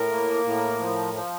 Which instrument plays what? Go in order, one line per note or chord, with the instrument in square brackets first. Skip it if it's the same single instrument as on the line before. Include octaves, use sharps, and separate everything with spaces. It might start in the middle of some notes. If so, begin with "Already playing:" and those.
Already playing: [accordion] A2 [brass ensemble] A#4
[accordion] A#3
A2
F3
F3